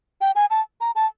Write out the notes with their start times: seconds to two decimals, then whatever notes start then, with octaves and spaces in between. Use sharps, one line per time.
0.21 G5
0.35 G#5
0.50 A5
0.81 A#5
0.95 A5